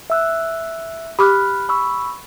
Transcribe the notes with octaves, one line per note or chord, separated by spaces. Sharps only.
E5 E6 F#6
G4 B5 D6 F6 F#6
B5 C#6 E6